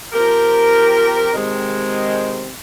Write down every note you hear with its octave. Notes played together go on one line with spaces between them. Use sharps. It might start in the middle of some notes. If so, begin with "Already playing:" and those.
F3 C4 G4 A#4
C3 D#3 G#3 C4